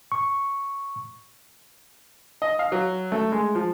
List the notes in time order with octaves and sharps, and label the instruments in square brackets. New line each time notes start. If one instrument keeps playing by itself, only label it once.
[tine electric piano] C#6
[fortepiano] D#5
F5
F#3
A3
G#3
F3